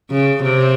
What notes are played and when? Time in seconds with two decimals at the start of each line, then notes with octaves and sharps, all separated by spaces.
0.11 C#3
0.43 C3